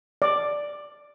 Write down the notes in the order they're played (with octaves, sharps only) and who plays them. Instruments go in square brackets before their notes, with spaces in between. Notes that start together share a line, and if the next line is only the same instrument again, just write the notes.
[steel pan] D5